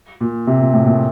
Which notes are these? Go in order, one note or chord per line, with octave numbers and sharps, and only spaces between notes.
A#2
C3
A#2
A2
A#2